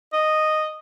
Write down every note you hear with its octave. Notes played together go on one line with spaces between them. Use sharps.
D#5